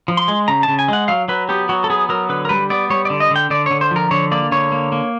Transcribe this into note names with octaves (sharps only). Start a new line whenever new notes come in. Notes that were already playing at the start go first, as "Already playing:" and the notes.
F3
C6
G#3
C#3 A#5
A5
C#3
G#5
G#3 F#5
F#3 F5
F#3 B4
B3 G4
F#3 F#4
A4
B3 G#4
F#3 A#4
D3 B4
A#4
G3 B4
B3 D5
G3 C#5
D3 D5
D#5
D3 G5
D3 D5
D3 C#5
C5
F3 A#4
D3 C#5
A#3 D5
D3 C#5
A#3
A#3